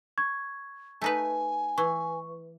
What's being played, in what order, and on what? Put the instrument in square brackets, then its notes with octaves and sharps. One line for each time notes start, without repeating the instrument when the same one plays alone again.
[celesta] C#6 G#6
[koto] A3 D#4 B4 [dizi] G#5
[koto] E3 [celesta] C#6